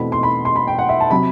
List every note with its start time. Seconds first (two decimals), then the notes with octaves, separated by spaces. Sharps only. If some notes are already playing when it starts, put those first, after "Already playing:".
Already playing: E2 B2 A3 C4 B5
0.12 C6
0.23 B5
0.45 C6
0.56 B5
0.67 G5
0.79 F#5
0.89 E5
1.00 A5
1.11 C3 F#3 B5